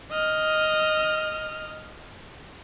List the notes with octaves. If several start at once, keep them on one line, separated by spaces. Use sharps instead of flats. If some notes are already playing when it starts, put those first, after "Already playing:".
D#5 F6